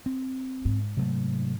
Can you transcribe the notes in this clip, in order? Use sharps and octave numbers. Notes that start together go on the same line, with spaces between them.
C4
G#2
C3 F#3 A3